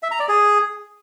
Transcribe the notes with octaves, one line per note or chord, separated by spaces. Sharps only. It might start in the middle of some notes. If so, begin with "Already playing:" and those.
E5
A#5
D5
G#4